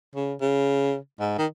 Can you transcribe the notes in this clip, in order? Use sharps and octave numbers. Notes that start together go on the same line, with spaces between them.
C#3
C#3
G#2
D#3